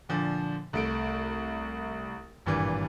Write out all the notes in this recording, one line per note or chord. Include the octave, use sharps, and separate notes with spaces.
A#2 D3 F3
C2 A3 D7
G#1 G2 A#2 E3